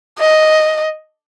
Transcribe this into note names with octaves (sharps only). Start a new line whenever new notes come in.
D#5